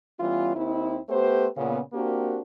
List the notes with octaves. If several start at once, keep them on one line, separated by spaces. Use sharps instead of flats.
E3 G3 B3 C#4 F4
D#2 C4 D#4 E4
A3 B3 G4 B4 C5
A#2 C#3 B3
A#3 C4 D4 F#4 G4 A#4